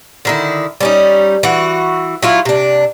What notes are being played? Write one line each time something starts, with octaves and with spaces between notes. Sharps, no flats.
D3 D#3 E4
G3 C#4 D#4
E3 F#4
F#3 E4 F4
C3 D4